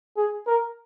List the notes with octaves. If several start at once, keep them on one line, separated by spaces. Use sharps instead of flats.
G#4
A#4